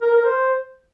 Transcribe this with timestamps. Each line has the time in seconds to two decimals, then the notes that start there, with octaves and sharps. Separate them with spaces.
0.02 A#4
0.13 A#4
0.25 C5